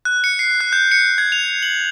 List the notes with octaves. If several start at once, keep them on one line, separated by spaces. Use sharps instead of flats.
F#6
C#7
C7
F#6
G6
C#7
G#6
F7
F#7